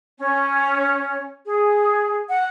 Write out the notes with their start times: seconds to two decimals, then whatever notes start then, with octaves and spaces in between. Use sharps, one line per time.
0.19 C#4
1.46 G#4
2.30 F#5